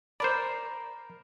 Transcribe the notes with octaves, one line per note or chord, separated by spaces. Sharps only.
A#4 C5 D5 B5